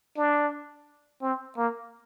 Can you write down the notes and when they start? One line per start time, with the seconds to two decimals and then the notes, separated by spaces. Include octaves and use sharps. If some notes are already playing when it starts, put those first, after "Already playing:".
0.17 D4
1.22 C4
1.57 A#3